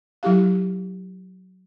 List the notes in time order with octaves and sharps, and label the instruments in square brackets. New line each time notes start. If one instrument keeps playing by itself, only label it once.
[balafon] F#3 E4 G4 F5